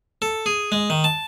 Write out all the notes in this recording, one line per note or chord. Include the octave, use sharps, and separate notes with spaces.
A4
G#4
G#3
D#3
A5